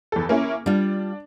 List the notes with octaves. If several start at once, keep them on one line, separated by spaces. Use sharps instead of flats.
E2 A4
A#3 C#4 E4
G3 D4 F4